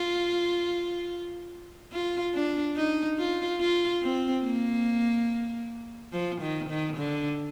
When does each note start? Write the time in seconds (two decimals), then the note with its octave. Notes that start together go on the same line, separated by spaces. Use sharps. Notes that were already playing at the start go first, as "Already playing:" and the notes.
Already playing: F4
1.92 F4
2.34 D4
2.76 D#4
3.18 F4
3.61 F4
4.02 C4
4.45 A#3
6.13 F3
6.42 D#3
6.70 D#3
6.97 D3